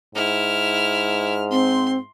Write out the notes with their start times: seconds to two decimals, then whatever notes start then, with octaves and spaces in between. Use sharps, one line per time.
0.15 G#2 E4 F6
1.51 C4 C6